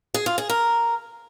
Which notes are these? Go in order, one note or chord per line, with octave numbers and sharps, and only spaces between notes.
G#4
F4
G#4
A#4